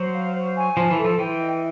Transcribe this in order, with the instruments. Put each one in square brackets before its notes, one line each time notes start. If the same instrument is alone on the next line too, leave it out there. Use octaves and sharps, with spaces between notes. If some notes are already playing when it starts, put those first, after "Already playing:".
Already playing: [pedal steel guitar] F#3 [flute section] C5
[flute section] F5
C5
G#5
[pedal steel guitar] F3 [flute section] A5
[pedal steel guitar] E3
[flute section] A4
[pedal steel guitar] F3
[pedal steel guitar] E3 [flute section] G5
[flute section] D#5